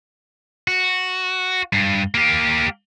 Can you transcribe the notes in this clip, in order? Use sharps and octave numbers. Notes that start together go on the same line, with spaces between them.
F#4
G2
A#3 G4